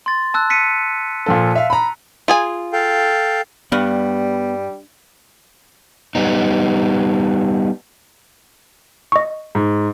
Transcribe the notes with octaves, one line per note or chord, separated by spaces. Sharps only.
C6 A6
A5 E6 F#6
B6 C#7 D#7
A#2 F3 A4
E5 F5
A#5 B5
F4 G#4 G#5
A4 F5 G5
G2 G3 B3
G3 B3 D#4
D#5 C#6
G#2